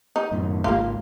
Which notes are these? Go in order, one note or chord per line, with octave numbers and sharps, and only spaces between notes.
D#4
F#2 A2 D#3
G#1 C#2 G#2 A#3 F4